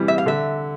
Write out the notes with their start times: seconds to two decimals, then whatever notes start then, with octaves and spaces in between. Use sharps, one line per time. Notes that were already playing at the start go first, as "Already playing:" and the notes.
Already playing: C3 E3 G3
0.08 E5
0.18 F5
0.26 D3 E5